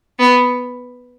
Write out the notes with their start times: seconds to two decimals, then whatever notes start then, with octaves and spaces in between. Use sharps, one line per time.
0.19 B3